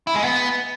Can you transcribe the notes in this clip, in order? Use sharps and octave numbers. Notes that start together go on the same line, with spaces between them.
E4
G#3
B3